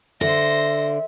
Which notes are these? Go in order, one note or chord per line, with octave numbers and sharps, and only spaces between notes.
D3 C5 E5 A#6